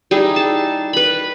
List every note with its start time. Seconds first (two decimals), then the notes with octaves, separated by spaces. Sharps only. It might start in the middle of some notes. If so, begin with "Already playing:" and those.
0.11 G3 D#4 E4 G#4
0.36 A5
0.93 B4 B5